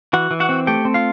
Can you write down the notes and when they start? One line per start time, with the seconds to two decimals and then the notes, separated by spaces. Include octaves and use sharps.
0.13 E3 F#4 F#5
0.31 E3
0.40 F#4 F#5
0.49 C4
0.67 A3 G4 G5
0.85 C4
0.94 F4 F5